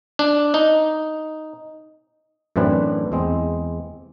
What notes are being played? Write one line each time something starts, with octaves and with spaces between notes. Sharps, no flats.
D4
D#4
F#2 A2 E3 C4 D4 B4
E2 G#3 C4